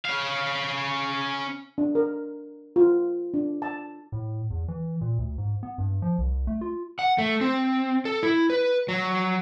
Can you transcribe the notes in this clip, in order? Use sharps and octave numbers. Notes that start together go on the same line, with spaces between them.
C#4 F5
D4
A#4
F4
D4
A5
A2
E2
E3
A#2
D2
G#2
B3
G2
F3
C2
A3
F4
F#5
A3
C4
A4
E4
B4
F#3